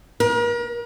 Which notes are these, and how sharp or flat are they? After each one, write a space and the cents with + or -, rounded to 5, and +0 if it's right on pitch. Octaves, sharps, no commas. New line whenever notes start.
A#4 +40